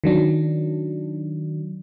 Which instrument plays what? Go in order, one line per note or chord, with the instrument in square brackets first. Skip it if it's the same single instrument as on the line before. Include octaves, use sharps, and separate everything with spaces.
[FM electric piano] D#3 F#3 D4